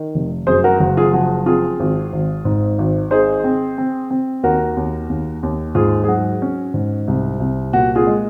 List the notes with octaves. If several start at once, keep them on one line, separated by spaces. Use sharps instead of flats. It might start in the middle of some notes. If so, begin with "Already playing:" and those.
Already playing: D#3
F1
F#2 G#4 C5
F#4 A#4
F#1 F#4
F4 G#4
F3 F#4
C4 F4 G#4
G#1
G#1
G#2
G#1
D#4 G#4 C5
C4
C4
C4
D#2 F#4 A#4
D#2
D#2
D#2
G#2 F4 G#4
G#4
F#3 F#4
C#4
G#2
C2
C2
A#2 F#4
F4 G#4
G#3